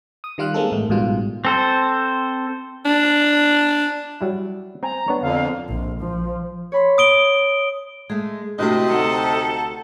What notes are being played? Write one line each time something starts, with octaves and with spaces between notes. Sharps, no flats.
D#6
D#3 G3 F4 F5 F#6
G#3 A#3 C4 D#4 A4
A1 G#2 A3
A1 G#2 B2 G3 F4
C4 A4 C5
D4
F#3 G3 E4
C4 G5 G#5 A#5
B3 D4 C#5
F2 D3 F5
A#1
F3
C#5 B5 C6
D#6 D7 G7
G#3 A3 G#4
C3 A3 D4 E4 F#4 D#5
D2 D#4 F#4 G4 A4 F#5 A#5